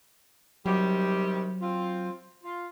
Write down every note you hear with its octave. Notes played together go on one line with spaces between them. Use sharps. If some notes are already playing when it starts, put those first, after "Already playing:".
C3 D#3 F#3 G3
C4 F4
F4